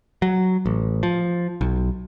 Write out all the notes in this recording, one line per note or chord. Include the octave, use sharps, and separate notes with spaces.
F#3
A1
F3
B1